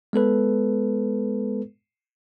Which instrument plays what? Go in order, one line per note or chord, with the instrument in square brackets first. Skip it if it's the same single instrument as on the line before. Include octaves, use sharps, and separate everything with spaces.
[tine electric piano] G#3 B3 A4 B4